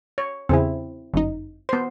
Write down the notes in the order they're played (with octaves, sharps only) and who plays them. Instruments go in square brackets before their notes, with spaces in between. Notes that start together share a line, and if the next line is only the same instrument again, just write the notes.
[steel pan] C#5
[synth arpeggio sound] E2 C#3 G#4 [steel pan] C4 E4
[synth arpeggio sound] G1 F#2 D#4
[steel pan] B3 C5 [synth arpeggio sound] C6